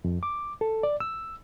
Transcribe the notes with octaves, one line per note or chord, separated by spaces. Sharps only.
F2
D6
A4
D5
E6